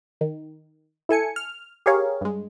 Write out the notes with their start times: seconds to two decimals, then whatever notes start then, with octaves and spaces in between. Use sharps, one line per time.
0.21 D#3
1.09 E4 A4 G#5 C#7
1.36 F6
1.86 G4 G#4 A#4 C#5 F5
2.21 G2 G#3